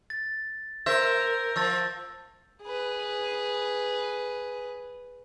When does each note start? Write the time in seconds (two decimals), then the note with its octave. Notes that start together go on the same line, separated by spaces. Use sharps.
0.10 A6
0.86 A#4 C5 E5 E6 G6 A#6
1.56 F3 C#6 E6 A6
2.62 G#4 B4